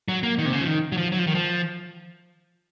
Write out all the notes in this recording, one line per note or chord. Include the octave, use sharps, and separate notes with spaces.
F#3
A#3
D#3
C3
C#3
F3
D#3
F#3
F3
F#3
F3
D#3
F3